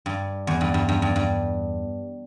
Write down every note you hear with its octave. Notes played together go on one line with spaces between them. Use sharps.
G2
E2
G2
G2
G2
G2
G2